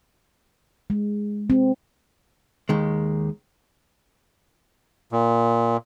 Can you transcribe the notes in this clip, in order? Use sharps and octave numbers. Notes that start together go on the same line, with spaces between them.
G#3
C4
D#2 D#3 G#3
A#2